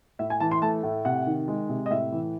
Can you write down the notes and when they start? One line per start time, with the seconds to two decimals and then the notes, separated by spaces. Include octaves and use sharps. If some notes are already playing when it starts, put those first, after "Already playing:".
0.19 A2 E5
0.30 G#5
0.40 E3 A5
0.51 C6
0.62 A3 A5
0.83 A2
1.05 C3 F#5
1.26 D#3
1.48 G#3
1.69 C3
1.86 D#5
1.90 A2 E5
2.12 E3